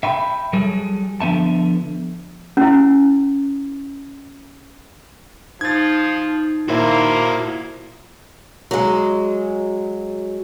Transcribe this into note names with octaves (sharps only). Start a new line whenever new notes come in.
E5 G5 B5
F#3 G3 G#4 A4
D3 F3 B3 E5 A5
C#4 E4
F3 D#4 G#6 A6
A#2 A#3 E4 F#4 C5
F#3 G#3